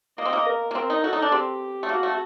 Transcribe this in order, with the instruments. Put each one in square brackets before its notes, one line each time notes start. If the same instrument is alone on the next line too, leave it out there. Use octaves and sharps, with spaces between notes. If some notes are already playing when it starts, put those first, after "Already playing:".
[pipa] A#3 [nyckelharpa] D#5
[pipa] C4
A#3
[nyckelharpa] A#4
[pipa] A#3
[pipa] C4 [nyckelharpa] A#4
[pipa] D#4
[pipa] F#4 [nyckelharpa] A4
[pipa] D#4
D4
[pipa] C4 [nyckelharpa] G4
[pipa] A3
[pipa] A#3 [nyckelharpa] F#4
[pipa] A3